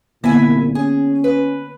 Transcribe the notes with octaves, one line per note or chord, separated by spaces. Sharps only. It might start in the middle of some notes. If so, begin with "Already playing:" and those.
C2 A#2 D3 A#3 B3 E4 E5 G#5
C#4 G#4 G#5
B4